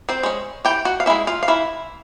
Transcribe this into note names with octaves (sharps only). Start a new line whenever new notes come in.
C4 C5
G#3 C#4
E3 G4 G5
F#4 F#5
F5
G#3 C#4 E4 E5
F4 F5
F5
E3 E4 E5